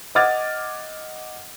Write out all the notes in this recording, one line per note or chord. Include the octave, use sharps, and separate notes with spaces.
D#5 F#5 D6 F6 G#6 A6